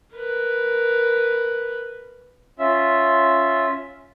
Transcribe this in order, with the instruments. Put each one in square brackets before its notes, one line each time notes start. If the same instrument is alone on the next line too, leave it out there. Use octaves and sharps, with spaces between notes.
[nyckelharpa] A#4 B4
[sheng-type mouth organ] C#4 F4 E5